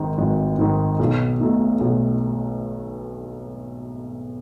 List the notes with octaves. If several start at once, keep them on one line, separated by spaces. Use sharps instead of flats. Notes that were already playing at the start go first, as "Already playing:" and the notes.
Already playing: G#1 G#2 D#3
G#1
G#2 D#3
B1
B2 A3 D#4
B1